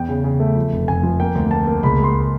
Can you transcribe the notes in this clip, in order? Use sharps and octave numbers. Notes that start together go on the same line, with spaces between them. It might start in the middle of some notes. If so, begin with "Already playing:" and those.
Already playing: E2 G5
C#3
C#3
A3
F3
F1
F1 G#5
F3
A#3 G5
D2
A#3 A5
A#3
C#2 B5
G#3 C6